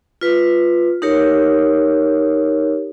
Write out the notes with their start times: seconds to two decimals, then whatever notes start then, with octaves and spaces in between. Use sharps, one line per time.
0.21 F4 B4
1.02 D#4 G4 A#4 C#5